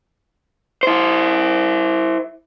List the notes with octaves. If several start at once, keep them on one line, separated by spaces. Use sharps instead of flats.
E4 C5